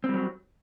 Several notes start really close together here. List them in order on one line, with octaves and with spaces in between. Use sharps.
C4 G3 F#3